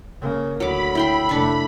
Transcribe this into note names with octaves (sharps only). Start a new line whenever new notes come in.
C#3 A#3
D2 F#3 B5 D6
E4 G5 C6
F1 A3 D4 C#6